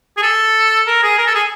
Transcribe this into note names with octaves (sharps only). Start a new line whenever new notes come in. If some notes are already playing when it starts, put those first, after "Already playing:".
G#4
A4
A#4
G#4
A#4
A4
G#4